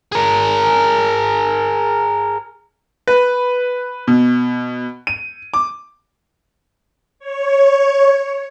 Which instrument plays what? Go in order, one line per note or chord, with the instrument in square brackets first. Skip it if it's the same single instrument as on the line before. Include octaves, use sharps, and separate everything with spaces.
[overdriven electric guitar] G#4 A#4
[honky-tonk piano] B4
B2
D#7
D6
[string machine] C#5